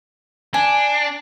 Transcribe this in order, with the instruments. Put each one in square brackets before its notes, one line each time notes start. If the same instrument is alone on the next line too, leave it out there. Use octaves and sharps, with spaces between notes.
[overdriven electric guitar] D4 [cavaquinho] G#5